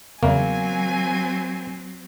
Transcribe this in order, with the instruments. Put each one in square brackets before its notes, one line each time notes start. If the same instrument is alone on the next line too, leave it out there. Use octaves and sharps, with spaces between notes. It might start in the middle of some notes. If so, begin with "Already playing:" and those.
[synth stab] E2 C#3 [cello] F#3 C4 [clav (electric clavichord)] A#3 [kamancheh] G#5